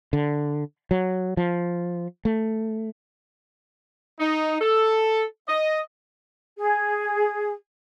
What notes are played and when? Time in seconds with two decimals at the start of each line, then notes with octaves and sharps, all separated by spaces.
0.13 D3
0.91 F#3
1.37 F3
2.25 A3
4.19 D#4
4.60 A4
5.48 D#5
6.58 G#4